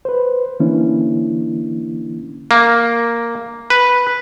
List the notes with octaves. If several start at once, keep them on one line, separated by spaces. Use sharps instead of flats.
B4 C5
D3 E3 A#3 C#4 D4 E4
A#3
B4